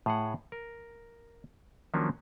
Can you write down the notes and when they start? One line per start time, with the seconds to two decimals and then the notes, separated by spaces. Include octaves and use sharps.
0.06 A2 G#4 F#5
0.52 A#4
1.94 D#3 F3 F#3 A#3 C#4 D4